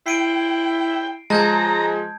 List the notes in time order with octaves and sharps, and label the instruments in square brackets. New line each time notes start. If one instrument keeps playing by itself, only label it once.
[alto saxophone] E4 [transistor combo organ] G5 [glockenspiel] C7 D7 D#7
[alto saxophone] F3 [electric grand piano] G#3 D#5 [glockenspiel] A5 G6 G#6 [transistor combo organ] A#5